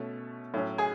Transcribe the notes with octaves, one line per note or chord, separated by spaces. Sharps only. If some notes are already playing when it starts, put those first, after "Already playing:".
Already playing: B2 A3 C#4
A2 F#3 C#4
G#4 G#5